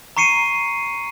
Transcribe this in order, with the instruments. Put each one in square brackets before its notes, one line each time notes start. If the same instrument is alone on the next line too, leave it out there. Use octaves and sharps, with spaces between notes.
[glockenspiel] A#5 C#6 C7 C#7 D#7